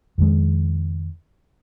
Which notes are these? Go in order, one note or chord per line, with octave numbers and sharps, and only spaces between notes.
F2 D#3 G#3